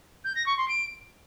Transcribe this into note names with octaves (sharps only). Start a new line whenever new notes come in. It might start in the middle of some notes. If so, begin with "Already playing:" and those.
G6
A#6
C#6
C6
D7